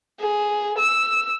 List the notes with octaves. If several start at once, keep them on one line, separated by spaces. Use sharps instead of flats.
G#4
E6